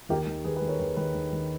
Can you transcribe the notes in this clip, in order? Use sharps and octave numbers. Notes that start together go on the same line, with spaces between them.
D#2 G4 A#4
D#3
D#2 G#4 B4
G#4 B4
D#3
A#4 C#5
D#2 G#4 B4
D#3 G#4 B4
D#2
D#3